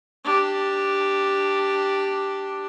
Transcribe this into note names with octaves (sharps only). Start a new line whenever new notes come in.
D4 G4